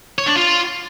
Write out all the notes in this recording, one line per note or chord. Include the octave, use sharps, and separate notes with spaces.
C#5
D4
F4